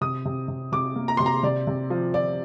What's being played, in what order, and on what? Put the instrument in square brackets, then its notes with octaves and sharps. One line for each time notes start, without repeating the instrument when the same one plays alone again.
[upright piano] C3 D#6
C3
C3
C3 D6
A#3
A#5
C3 C6
A#5
C3 D5
C3
F3
F3 D5